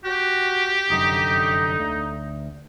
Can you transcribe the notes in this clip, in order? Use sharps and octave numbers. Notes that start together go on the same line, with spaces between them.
F#4 G4
F1 F#2 D3 D#4
D2